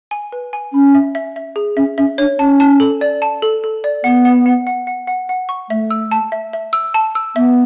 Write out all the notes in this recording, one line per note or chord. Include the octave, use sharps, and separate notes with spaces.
G#5
B4
G#5
C#4 B5
E5
E5
E5
G#4
C#4 E5
C#4 E5
D4 C#5
C#4 A5
A5
A4
D5
A5
A4
A4
D5
B3 F#5
F#5
F#5
F#5
F#5
F#5
F#5
C#6
A3 E5
E6
A5
E5
E5
E6
A5
E6
B3 E5